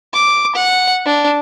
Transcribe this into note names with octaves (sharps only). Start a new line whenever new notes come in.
D6
F#5
D4